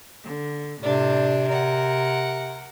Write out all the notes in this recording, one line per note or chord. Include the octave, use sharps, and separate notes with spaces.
D3
A2 C3 D4 D5
A#4 F#5